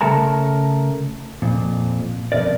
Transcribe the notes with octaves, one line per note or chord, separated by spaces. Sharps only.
C#3 A3 A4 A#4 A5 A#5
F2 A#2
F2 G#2 B2 A#4 D5